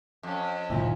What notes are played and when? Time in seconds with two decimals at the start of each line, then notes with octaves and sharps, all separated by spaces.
0.23 F2 C#4
0.70 F#1 D2 A#2 D#3 C4 E4